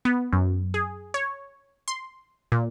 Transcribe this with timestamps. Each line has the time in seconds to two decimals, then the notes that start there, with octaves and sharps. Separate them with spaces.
0.05 B3
0.33 F#2
0.74 G#4
1.14 C#5
1.88 C6
2.52 A#2